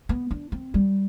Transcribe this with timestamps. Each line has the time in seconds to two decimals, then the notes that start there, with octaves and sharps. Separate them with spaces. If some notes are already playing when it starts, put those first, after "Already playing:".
0.09 B3
0.31 D4
0.52 C4
0.74 G3